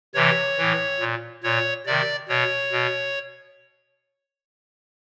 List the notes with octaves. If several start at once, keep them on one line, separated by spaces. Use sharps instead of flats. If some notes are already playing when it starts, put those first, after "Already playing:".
C3 E3 C#5
A2 E3
A#2
A#2 C#5
C3 D#3 D5
B2 C#5
B2